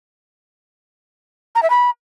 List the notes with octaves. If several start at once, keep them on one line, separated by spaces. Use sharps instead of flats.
A#5
E5
B5